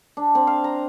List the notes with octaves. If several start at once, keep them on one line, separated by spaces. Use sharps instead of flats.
D4
C4
F5
A#5